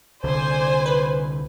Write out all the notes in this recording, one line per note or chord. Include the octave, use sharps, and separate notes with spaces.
C2 D3 C5 D5 G#5
B4